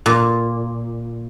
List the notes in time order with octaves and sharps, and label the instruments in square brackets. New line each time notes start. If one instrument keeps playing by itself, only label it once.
[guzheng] A#2